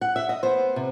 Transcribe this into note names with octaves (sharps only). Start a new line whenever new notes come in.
F#5
E5
D#5
B3 C5
C3